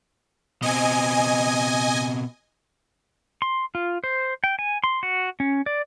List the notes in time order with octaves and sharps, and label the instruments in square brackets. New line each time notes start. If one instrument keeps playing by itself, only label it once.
[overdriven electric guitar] B2 C4 [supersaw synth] D#5 G#5
[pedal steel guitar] C6
F4
C5
G5
G#5
C6
F#4
C#4
D5